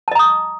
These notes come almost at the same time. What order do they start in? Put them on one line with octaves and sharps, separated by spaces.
A5 D#5 A#5 D#6 C#6